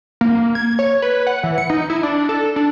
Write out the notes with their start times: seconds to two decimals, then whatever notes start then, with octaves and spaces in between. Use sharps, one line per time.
0.21 A#3
0.55 G#6
0.79 C#5
1.02 B4
1.27 F#5
1.44 E3
1.58 C#7
1.70 D#4
1.90 E4
2.03 D4
2.29 A4
2.56 D4